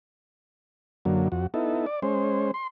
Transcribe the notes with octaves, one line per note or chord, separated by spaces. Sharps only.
F#2 D3 F#3 A#3
F2 F#4
B3 D#4 E4 A4
D5
G#3 C#4 C5
C6